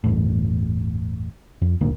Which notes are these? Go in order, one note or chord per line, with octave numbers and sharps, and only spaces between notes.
G1 E2 A2
F2
D#1 G#1 D2 A#3